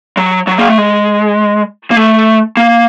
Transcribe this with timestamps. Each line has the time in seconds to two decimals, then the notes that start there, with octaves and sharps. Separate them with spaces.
0.17 F#3
0.47 F#3
0.58 A#3
0.68 A3
0.78 G#3
1.91 A#3
1.96 A3
2.57 A#3